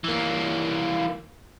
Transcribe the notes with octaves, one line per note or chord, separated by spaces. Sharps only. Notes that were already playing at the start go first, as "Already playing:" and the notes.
E3 A#3